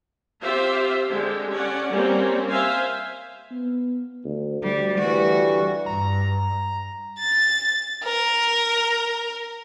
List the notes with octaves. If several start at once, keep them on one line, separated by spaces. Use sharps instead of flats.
C4 F4 G4 C5 E5 F5
D3 G#3 G4
C#4 D5 F#5
G3 A#3 C4 C#4
C5 E5 F5 G#5
B3
D2
D2 G3
E3 G3 F#4
G2 A#5
A6
A#4